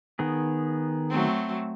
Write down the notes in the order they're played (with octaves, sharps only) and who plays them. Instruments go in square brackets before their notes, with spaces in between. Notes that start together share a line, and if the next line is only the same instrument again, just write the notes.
[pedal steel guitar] D#3 B3 G#4
[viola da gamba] F#3 A3 C4